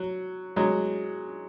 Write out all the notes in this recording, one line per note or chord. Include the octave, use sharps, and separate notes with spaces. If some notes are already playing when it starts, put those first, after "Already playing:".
Already playing: F#3
F#3 G#3